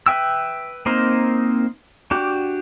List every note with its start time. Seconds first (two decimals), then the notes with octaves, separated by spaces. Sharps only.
0.06 B4 E5 G5 E6
0.86 A#3 C4 D#4 A#4 C5
2.11 D4 F#4 G4